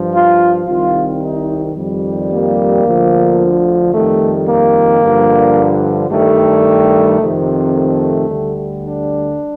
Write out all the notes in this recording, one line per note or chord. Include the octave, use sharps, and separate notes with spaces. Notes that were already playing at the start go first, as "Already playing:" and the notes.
Already playing: G2 F3
F4
C2 C3 D#3 G3 F4
D#4
F2 D#3 G3
A#3
D2 D3 F3
F2 D#3 G3 A3
A#3
G2 D3 F3
G2 D#3 G3 A3
F2 C3 D#3
A3
D2 D3 G3
D4